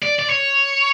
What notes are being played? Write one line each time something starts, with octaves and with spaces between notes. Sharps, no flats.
D5
D5
C#5